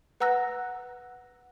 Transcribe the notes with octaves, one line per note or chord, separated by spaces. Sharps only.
B4 F#5 A#5 E6 F#6 A#6